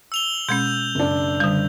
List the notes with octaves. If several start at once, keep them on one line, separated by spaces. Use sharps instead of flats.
E6 F7 G7
B2 G#3 C#4 G6
F#1 D4
D3 G3